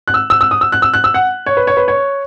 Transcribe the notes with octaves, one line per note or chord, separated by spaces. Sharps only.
F#6
E6
E6
E6
D#6
E6
F#6
E6
F#6
E6
F#5
C#5
B4
C#5
B4
C#5